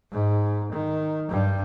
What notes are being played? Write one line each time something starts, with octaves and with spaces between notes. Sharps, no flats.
G#2
D#3
G2 G3